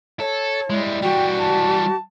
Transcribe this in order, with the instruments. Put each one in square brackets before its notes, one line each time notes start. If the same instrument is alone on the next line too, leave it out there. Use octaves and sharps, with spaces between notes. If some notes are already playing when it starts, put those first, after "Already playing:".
[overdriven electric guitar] A4 [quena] C#5
[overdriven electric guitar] G3 G#3 [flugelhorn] E4
[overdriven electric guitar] E3 G3 [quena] F#4 [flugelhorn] G5
[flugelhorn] A5